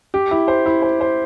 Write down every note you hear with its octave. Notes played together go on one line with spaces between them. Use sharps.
G4
E4
C5
E4
C5
C5